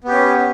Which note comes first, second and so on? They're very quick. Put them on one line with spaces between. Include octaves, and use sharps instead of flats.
B3 G4 C#4